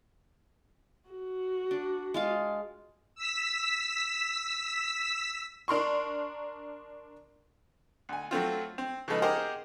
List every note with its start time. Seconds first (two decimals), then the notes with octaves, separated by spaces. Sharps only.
1.10 F#4
1.71 D4
2.14 G#3 F4 F5
3.15 E6 B6
5.68 D4 A#4 C6 C#6
8.09 D2 G#5
8.31 F#3 A3 C4 F4
8.78 C4
9.08 C#3 F3 G#3 D#4 A4 B4
9.22 G4 G#4 A#4 C5 D#5 F#5